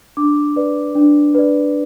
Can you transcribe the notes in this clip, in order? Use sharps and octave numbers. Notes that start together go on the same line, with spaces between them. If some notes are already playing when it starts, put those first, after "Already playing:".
D4 D6
B4 D5
D4
B4 D5